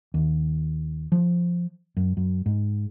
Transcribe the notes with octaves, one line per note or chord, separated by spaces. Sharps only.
D#2
F3
F#2
F#2
G#2